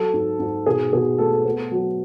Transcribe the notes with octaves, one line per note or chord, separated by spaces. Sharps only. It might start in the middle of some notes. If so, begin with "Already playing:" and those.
Already playing: F#3 A4
G#2
G#2
B2 G#4
B2 G#4
A3 A4
B3
F#3